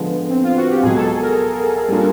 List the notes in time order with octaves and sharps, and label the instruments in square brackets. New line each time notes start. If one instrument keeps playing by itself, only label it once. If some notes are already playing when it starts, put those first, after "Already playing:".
Already playing: [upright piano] D3 F3 G#3 [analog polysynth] B3
[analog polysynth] C4
F4
F#4
G4
[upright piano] C#2 B2 F#3 [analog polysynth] G#4
[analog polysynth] A4
A#4
[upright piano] G3 A#3 D4 F4